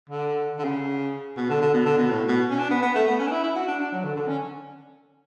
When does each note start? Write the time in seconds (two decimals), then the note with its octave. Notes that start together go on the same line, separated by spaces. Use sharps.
0.09 D3
0.58 D3
0.64 C#3
1.37 B2
1.50 D3
1.61 D3
1.74 B2
1.86 D3
1.98 B2
2.10 A2
2.28 B2
2.50 C#4
2.58 D4
2.71 B3
2.82 B3
2.95 A3
3.07 B3
3.19 C#4
3.27 D4
3.31 E4
3.43 E4
3.55 F#4
3.68 D4
3.80 D4
3.92 F#3
4.04 D3
4.16 D3
4.28 C#4